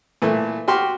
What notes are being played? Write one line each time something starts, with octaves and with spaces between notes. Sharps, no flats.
A#2 E3 A3
F#4 G4 C6 F6